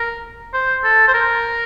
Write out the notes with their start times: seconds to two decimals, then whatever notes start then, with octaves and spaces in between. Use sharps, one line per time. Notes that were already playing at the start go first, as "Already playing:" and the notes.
Already playing: A#4
0.53 C5
0.84 A4
1.08 C5
1.14 A#4